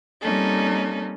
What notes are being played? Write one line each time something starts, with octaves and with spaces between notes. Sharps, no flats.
G3 A#3 C4 C#4 D#4 A4